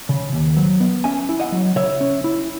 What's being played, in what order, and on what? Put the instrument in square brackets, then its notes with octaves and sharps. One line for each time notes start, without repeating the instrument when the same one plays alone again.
[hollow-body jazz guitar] C#3
D#2
F#3
B3
C#4 E5 G#5
E4
D#5 F#5
F#3
C#3 C#5 E5
C#4
E4